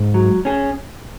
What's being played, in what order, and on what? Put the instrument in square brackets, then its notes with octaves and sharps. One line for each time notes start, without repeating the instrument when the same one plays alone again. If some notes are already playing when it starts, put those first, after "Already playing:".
Already playing: [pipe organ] G#2
[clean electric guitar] F#3
C#4 G#4